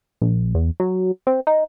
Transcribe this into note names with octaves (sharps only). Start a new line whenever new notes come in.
A#1
E2
F#3
C4
D#4